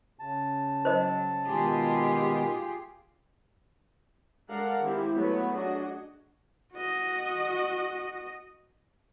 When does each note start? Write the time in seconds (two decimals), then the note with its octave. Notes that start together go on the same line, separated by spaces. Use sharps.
0.19 C#3 A5
0.85 F#3 C5 D#5
1.48 B2 D#3 G#3 F4 G4 G#4
4.49 G#3 D4 A4 A#4 F5 F#5
4.80 D#3 G#3 C4 E4 G4
5.13 F#3 A3 B3 B4
5.55 D4 F#4 G#4 D#5
6.73 F#4 D#5